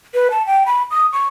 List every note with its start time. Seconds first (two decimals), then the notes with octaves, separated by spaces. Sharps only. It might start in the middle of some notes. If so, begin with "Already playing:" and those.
0.14 B4
0.31 A5
0.46 G5
0.66 B5
0.91 D#6
1.13 C#6